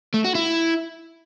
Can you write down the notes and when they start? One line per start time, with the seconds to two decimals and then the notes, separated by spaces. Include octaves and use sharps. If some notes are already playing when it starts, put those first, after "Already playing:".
0.14 A3
0.24 F#4
0.35 E4